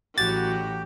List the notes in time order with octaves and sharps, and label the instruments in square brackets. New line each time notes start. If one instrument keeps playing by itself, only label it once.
[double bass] A1 E3 [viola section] F#3 F#4 [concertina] G4 G5 [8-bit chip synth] A6